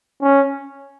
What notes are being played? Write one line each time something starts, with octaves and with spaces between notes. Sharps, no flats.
C#4